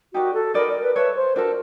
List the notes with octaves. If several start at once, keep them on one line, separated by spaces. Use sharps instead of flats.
D#4 F#4 G4 A#4 D5
A4
D#4 F#4 A#4 B4 D5
A#4
B4
A4 B4 C#5 E5
C5
D4 F#4 A4 A#4